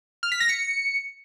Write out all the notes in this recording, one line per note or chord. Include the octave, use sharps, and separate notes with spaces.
F6
B6
A#6
C#7